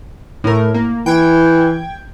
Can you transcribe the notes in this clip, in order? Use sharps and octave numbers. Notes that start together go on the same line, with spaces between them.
A2 A#4
A#3
E3 G5 G#6